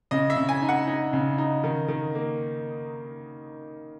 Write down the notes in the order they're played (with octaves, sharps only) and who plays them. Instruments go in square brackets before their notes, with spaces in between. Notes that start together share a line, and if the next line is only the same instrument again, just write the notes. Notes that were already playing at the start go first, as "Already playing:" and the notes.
[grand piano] C#3 D#5
E5
C#3
G#5
D#4
F#5
D#4
C#3
D#4
D#3
D#3
A#3